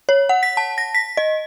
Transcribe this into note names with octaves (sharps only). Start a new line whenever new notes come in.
C#5
F#5
B6
A5
A#6
B6
D#5